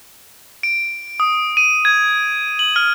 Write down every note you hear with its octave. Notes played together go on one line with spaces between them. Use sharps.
D7
D#6
D#7
G#6
F#7
F6